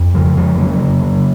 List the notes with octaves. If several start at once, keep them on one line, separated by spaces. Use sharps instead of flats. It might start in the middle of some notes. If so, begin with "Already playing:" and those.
Already playing: F2
C#3 F3
F2 F3 G#3
C#3 F#3 A#3
C#3
C#3